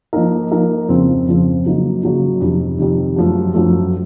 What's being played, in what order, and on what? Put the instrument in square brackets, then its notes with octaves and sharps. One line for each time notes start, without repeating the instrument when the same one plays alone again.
[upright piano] F3 A#3 D#4 A#4
F3 A#3 D#4 A#4
F2 C#3 F3 C4
F2 C#3 F3 C4
C#3 F#3 A#3 D#4
C#3 F#3 A#3 D#4
F2 C3 D#3
F2 C3 D#3
F#2 F3 A3
F#2 F3 A3